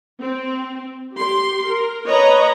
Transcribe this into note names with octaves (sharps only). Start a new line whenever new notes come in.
C4
G4 C6
A#4
B4 C#5 D#5 A#5